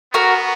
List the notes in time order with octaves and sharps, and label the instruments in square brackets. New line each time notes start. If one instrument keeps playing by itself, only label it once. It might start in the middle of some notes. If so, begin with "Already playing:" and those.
[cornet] B3 [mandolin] F#4 A#4